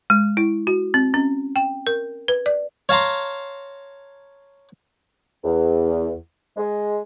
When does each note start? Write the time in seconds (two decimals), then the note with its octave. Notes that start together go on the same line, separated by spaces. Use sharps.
0.10 G#3
0.37 E4
0.67 F#4
0.94 C4
1.14 C#4
1.56 G5
1.87 A#4
2.28 B4
2.46 D5
2.89 C#5 F5 A5 A#5 C6
5.44 E2
6.57 G#3